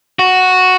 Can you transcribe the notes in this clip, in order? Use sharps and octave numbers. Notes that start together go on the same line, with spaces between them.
F#4